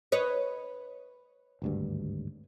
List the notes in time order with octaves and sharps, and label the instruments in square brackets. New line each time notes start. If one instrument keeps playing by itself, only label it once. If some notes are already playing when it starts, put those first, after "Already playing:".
[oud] B4 C#5 D#5
[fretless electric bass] G#1 D2 G2